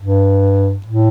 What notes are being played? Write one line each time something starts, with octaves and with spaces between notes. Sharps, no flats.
G2
A2